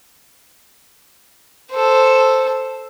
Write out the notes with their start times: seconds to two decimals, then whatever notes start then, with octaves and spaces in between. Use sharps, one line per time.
1.72 A4 C5